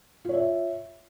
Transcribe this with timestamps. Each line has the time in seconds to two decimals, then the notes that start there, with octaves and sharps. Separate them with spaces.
0.25 F4
0.29 C#5
0.34 E5